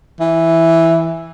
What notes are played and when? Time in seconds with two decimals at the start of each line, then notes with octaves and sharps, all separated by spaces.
0.20 E3